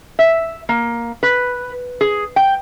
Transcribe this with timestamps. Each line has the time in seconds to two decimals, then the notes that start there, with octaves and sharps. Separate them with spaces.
0.19 E5
0.69 A#3
1.23 B4
2.01 G#4
2.36 G5